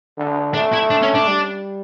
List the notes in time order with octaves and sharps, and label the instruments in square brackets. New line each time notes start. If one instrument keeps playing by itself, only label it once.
[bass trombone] D3
[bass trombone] A3 [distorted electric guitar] D4
[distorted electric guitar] E4
D4
C#4
D4
[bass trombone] G3